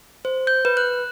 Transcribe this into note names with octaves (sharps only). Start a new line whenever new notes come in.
C5
G6
B4
F#6